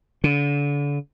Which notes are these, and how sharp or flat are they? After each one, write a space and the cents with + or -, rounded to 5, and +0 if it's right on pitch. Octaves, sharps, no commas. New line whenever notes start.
D3 -35